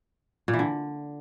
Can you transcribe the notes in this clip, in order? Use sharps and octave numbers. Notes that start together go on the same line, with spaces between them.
A#2
E3
D3